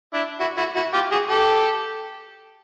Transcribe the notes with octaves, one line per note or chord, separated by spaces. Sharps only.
D4 E4
E4 F#4
E4 F#4
E4 F#4
F4 G4
F#4 G#4
G4 A4